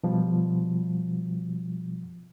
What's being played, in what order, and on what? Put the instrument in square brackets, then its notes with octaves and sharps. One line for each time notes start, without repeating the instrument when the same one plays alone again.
[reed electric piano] B2 F3 G3